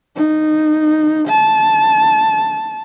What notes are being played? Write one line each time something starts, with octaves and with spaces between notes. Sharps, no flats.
D#4
A5